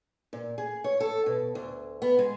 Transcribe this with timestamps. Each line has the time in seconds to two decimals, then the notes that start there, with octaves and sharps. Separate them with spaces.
0.33 A#2
0.58 G#4
0.84 C#5
1.00 A4
1.26 B2
1.55 D2
2.02 B3
2.19 G#3